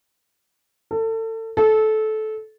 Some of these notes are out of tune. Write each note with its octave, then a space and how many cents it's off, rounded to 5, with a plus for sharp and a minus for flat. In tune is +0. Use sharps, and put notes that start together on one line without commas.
A4 +30
A4 -20